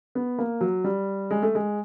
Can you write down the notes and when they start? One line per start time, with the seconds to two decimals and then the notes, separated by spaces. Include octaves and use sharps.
0.15 B3
0.39 A#3
0.61 F#3
0.84 G3
1.31 G#3
1.43 A3
1.55 G#3